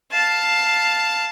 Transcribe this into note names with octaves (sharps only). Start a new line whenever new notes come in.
F5 A5